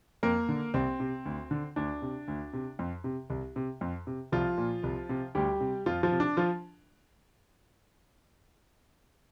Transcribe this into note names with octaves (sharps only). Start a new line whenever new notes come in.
F2 A#3 A#4
D3
C2 C4
C3
D2
D3
D2 D4
C3
D2
C3
F2
C3
C2
C3
F2
C3
C2 F3 F4
A#2
C2
C3
D2 G3 G4
C3
F2 F3 F4
F3 F4
C3
D4
F3 F4